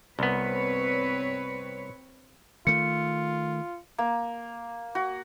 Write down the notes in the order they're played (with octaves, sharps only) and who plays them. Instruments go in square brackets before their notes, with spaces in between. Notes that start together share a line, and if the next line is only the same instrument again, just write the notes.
[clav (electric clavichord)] C2 B3 [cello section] C4 B4 C#5
[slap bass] D#3 A3 [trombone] F4 [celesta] C#7
[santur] A#3
F#4